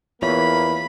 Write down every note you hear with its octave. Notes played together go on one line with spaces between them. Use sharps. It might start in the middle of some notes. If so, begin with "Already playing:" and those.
E2 A#3 F4 C#5 E5 B5